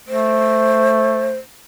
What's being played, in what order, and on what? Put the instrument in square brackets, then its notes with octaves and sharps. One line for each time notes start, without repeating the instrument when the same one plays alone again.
[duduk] A3 [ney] C5